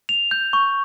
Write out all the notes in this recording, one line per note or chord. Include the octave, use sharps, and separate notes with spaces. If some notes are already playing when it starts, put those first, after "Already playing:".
F7
G6
C#6